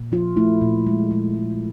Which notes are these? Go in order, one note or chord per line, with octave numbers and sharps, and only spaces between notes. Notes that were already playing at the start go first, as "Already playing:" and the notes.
Already playing: A#2
F3 F4
A3 E4
A#2
G#3
G#3
G#3